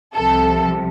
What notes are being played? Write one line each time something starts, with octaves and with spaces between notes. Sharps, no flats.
C2 C3 F3 A4